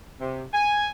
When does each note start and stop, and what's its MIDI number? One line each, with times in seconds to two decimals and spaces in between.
0.20 0.44 48
0.53 0.88 80